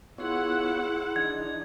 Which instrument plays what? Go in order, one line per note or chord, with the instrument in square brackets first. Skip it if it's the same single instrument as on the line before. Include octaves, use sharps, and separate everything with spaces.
[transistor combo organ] B3 F4 C#5 [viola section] E4 F#5 [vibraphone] G#4 C6 E6
[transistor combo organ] E3 D4 D#4 [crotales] G#6